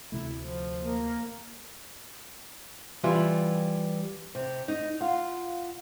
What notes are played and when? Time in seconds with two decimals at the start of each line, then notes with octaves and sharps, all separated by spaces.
0.12 D2 C3 A3 E4
0.39 F3
0.82 A#3
3.04 E3 G3 E4 F4
4.35 C3
4.68 D#4
5.01 F4 F5 F#5